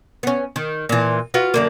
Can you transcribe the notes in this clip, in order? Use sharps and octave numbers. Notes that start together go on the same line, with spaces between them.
B3 C#4
D#3
A#2 E3
F4 F#4 B4
F#2 D3 A#3